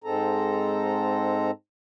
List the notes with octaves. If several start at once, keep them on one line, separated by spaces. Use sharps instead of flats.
G#2 G#3 C4 A4 A#5